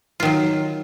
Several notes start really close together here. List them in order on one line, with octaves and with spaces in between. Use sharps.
F4 D#3 F#3